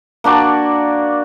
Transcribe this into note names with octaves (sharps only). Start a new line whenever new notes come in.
A#3 D4 F#4 D5